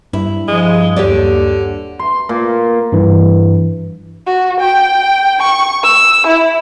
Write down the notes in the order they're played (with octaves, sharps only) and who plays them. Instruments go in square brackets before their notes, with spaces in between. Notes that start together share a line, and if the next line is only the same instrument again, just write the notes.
[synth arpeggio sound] G2 [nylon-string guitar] E4
[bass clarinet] F3 [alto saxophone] G#3
[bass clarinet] D#2 [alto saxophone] D3 [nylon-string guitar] G4 C#5 D5
[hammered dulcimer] C6
A#2
[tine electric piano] G2 E3
[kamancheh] F#4
G5
C#6
E6
E4